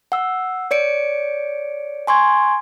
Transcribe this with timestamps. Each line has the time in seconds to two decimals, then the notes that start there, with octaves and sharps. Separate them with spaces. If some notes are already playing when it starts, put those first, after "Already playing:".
0.12 F#5 E6
0.71 C#5 D5 C#7 D7
2.07 G#5 C6 C#6 G#6